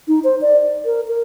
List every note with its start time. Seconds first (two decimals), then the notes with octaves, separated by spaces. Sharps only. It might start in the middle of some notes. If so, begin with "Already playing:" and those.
0.08 D#4
0.24 C5
0.41 D5
0.86 A#4
1.08 A#4